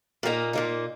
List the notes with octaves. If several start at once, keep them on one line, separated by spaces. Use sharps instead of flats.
A#2 A#3 D#4
A#2 A#3 D#4